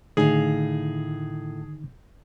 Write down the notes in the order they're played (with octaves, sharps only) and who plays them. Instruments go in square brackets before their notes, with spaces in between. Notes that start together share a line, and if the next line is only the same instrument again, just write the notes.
[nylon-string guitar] A2 F5 [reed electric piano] D3 D#3 D#4 [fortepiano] G#4